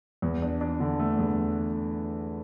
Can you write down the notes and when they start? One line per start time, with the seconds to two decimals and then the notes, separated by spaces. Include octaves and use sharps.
0.22 E2
0.42 D4
0.61 D4
0.80 D3
0.99 A3
1.19 E2